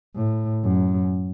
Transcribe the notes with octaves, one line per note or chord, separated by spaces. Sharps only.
A2
F#2